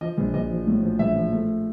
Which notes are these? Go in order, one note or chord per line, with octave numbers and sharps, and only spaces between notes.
F3 D#5
A#1
A#1 D#5
F3
A2
F3
A#1 E5
F3
A3